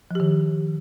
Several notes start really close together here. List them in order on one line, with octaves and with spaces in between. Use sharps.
F3 G4 D#3